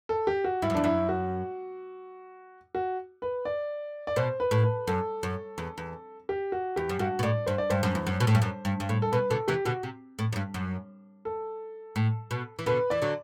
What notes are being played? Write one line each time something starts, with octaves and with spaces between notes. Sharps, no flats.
A4
G4
F#4
G2 E4
F#2
E2 D4
F#2 E4
F#4
F#4
B4
D5
D5
B2 C5
B4
A2
B4
F#2 A4
F#2
E2
E2
G4
F#4
E2 G4
F#2
G2 F#4
B2
A2 D5
G2 C5
D5
G2 C5
F#2
E2
F#2
B2
A2
G2
F#2
G2
G2
A2
A4
B2 B4
B2 D3 A4
C3 E3 G4
B2 D3 F#4
C3
A2
F#2
G2
F#2
A4
A2
B2
E3
B2 D3 B4
E3 D5
D3 F#3